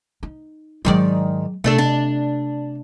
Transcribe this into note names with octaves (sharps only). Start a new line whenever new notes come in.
D#4
G#2 D#3 F#3 G#3 D5
C3 A3 D4 A4
D4